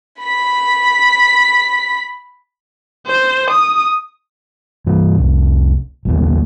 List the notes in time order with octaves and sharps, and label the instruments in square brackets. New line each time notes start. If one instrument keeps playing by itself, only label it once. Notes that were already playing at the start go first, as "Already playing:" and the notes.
[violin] B5 B6
[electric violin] C5
D#6
[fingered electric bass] G2 E3
F1 C2
A1 D#2 A2